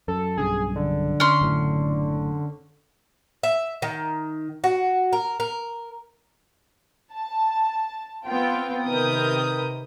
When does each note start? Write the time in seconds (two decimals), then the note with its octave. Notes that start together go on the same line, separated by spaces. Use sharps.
0.08 F#2 A4
0.38 B1 G2 C#3 G#4
0.76 D3
1.20 C#4 C6
1.41 F#1 A2
3.43 E5
3.82 D#3
4.64 F#4
5.13 A#4
5.40 A#4
7.13 A5
8.26 B3 C4 F4 G5
8.85 C3 D#3 A#4 B4 D#6 G6